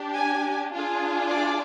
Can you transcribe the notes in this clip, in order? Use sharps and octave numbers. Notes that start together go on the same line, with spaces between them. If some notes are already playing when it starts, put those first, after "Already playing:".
Already playing: D4 G4
G#5
D4 F4 G#4
D5